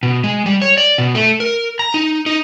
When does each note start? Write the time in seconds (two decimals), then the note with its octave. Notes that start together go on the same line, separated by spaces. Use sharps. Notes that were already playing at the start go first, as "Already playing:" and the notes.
0.03 B2
0.24 G#3
0.46 G3
0.62 C#5
0.78 D5
0.98 B2
1.15 A3
1.40 A#4
1.79 A#5
1.94 D#4
2.26 D#4